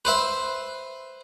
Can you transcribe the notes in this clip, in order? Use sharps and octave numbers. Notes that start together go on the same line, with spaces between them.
B4 C5 E5